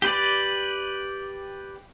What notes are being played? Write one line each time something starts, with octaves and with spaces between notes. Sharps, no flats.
G4 B4 D5